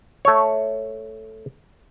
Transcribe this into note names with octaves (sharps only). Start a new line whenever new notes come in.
A3 C#5